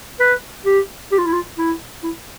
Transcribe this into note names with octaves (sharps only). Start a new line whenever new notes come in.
B4
G4
G4
F4
E4
F4
E4
E4